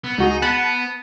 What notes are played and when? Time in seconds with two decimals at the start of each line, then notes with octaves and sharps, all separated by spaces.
0.04 B3
0.18 C#2 D#4 F#4 G#4
0.42 B3 F#5 A5 B5